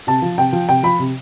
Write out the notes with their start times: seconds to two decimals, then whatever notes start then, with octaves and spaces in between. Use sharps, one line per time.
0.07 C3 A5
0.22 F3
0.38 C3 G5
0.53 F3
0.69 C3 G5
0.83 F3 B5
0.99 C3